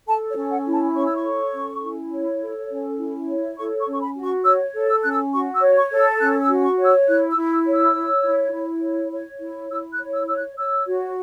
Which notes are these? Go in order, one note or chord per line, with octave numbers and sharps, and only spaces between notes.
A4 A5
C#5
C#4
F#5
E4
A5
C#5 C#6
E6
C#6
A4
C#4
E4
C#5
A4
C#4
E4
C#5
A4 C#6
C#6
C#4
C#6
B5
F#4
C#6
C#5 E6
A4
E6
C#4 F#6
E6
F#4 C#6
E6
C#5
C#6
A4
E6
C#4 F#6
E6
F#4
C#6
C#5
E6
E4 F#6
E6
E4
E6
C#5
E6
C#5
E4
E4
C#5
C#5
E4
E4 E6
F#6
C#5
E6
C#5 E6
F#6
C#5 E6
F#4